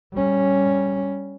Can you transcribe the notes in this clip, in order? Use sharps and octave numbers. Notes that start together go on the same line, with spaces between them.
G3 C#4